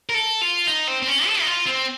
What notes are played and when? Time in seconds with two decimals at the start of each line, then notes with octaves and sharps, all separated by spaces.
0.09 A#4
0.14 A4
0.41 F4
0.67 D#4
0.87 C4
1.02 C4
1.07 C#4
1.27 A4
1.41 D#4
1.46 F4
1.66 C4